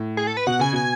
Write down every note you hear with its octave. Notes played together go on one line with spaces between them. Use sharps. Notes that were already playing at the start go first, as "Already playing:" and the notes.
Already playing: A2
G#4
A4
B4
B2 F#5
C#3 G#5
B2 G#5